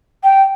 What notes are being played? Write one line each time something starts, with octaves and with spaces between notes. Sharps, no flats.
G5